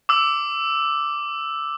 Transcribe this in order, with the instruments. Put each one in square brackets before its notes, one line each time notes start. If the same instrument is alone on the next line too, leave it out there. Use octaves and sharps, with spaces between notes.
[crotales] D6 E6